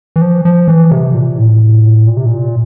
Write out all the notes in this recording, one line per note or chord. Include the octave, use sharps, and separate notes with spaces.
E3
F3
F3
E3
C3
A#2
A2
A#2
C3
A#2